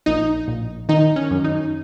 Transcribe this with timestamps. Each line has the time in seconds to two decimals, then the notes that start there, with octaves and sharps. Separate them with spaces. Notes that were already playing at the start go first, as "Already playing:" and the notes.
0.06 A#1 D#4
0.48 A#1
0.89 D#3 D#4
1.16 C#4
1.31 F#2
1.44 D#4